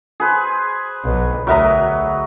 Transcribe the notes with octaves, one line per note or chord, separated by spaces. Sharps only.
G#4 B4 C5
B1
D2 F#3 A#4 B4 D#5 E5 A#5